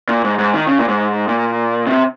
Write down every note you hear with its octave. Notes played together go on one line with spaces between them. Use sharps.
A#2
G#2
G#2
D#3
C#3
A#2
G#2
A#2
C3